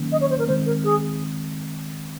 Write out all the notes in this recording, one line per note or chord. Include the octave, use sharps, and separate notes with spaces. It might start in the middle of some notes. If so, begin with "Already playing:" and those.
Already playing: D#3 F#3 A#3 C#4
D#5
C#5
C5
A#4
D#3 G#3 C4 C5
A#4
G#4